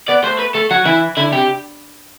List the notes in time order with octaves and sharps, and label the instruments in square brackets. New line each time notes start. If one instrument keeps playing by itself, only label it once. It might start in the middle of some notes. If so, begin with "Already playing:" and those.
[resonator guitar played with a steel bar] B3 [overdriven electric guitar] D5
[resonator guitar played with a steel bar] A3 [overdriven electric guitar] C5
[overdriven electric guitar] B4
[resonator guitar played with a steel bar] A3 [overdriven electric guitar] A4
[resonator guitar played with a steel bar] F#3 [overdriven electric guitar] F#4
[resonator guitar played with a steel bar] E3 [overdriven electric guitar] E4
[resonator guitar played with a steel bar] D3 [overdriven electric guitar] E4
[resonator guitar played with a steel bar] C3 [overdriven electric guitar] G4